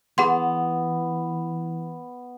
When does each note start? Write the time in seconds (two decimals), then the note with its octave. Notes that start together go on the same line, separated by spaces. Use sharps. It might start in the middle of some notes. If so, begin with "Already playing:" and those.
0.18 E3 B3 G#4 F#5 C6